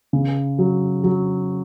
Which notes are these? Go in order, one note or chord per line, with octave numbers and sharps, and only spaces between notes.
C#3
F#3
F#3